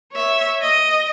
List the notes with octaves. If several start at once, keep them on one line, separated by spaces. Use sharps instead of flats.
C#5 E5
D#5